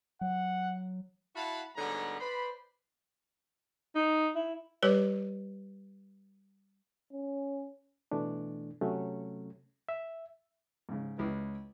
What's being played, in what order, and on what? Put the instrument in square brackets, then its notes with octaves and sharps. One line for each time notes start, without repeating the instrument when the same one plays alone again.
[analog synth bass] F#3 [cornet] F#5
[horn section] E4 F#4 F5 F#5 A5 B5
G#2 D3 F#3 G3 B3 A#5
B4 C5 D5 B5
[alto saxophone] D#4
E4
[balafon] G3 G4 B4 C#5
[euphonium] C#4
[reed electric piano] B2 E3 A3 D4
C3 F#3 A3 C#4
E5
[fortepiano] G#2 C#3
C#2 E4 B4